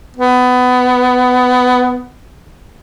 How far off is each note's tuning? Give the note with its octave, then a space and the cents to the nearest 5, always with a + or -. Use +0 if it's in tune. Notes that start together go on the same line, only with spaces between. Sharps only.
B3 +20